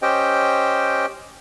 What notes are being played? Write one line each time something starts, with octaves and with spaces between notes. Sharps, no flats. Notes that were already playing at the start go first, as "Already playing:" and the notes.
C#4 G4 C5 D#5 G5